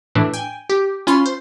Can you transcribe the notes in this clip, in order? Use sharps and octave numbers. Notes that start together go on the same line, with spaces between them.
A2 E3 D4
G5 G#5
G4
C#4 F4 B5 C6
C5